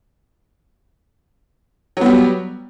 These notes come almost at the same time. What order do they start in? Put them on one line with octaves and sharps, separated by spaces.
F#3 B3 G3